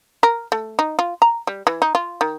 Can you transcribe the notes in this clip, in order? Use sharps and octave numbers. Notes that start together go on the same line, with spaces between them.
A#4
A3
D#4
F4
A#5
G3
E3
D#4
F4
D#3